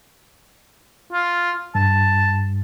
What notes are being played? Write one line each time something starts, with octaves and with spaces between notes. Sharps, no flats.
F4
G2 A5